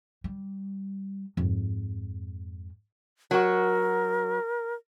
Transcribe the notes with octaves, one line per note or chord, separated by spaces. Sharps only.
G3
F2 G#2
F#3 F#4 A#4